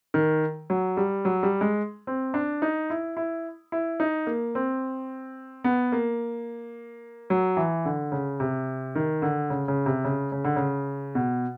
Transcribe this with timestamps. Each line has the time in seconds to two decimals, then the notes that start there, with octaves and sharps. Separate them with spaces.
0.14 D#3
0.70 F#3
0.97 G3
1.25 F#3
1.43 G3
1.61 G#3
2.07 C4
2.34 D4
2.62 D#4
2.90 E4
3.17 E4
3.72 E4
4.00 D#4
4.27 A#3
4.55 C4
5.64 B3
5.92 A#3
7.30 F#3
7.57 E3
7.85 D3
8.12 C#3
8.40 C3
8.95 D#3
9.22 D3
9.50 C#3
9.68 C#3
9.86 C3
10.05 C#3
10.32 C#3
10.44 D3
10.56 C#3
11.15 B2